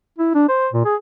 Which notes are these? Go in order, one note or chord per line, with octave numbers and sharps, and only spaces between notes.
E4
D4
C5
A#2
G#4